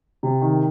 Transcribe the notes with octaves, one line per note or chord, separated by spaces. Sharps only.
C3
D#3